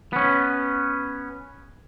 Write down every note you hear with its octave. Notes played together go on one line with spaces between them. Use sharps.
B3 C#4